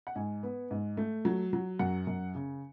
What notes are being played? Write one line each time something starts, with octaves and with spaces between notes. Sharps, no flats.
F#5
G#2 G#5
B3
G#2
A3
F#3
F#3
F#2 F#5
F#2
C#3